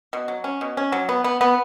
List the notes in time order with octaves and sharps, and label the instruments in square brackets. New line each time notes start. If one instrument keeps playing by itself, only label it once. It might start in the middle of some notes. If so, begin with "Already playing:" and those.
[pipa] B2
F#3
C#4
B2
C#4
F#3
B3
B3
B3